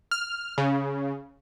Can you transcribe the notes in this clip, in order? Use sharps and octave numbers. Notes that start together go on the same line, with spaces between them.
F6
C#3